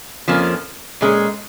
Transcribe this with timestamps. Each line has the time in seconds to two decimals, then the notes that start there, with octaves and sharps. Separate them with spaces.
0.28 F2 F3 A#3 C#4
1.01 A#2 G#3 C#4